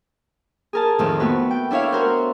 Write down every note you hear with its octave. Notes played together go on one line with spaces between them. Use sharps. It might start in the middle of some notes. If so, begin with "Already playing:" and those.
G#4 A#4 A5
F2 A2 D#3
A3 B3 F#4 B4
G5
D4 E4 C#5 E5 F5
F#4 A#4 C5